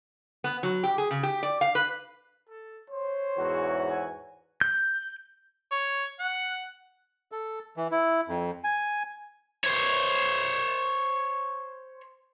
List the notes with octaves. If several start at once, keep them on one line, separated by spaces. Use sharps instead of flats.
B3
F#3
G4
G#4
C#3
G4
D5
F5
B4
A4
C5 C#5
E2 G#2 E3 F#4
G#5
G6
C#5
F#5
A4
E3
E4
F2
G#5
C5 C#5